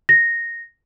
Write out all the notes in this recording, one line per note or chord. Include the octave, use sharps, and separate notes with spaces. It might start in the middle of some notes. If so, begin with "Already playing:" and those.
A#6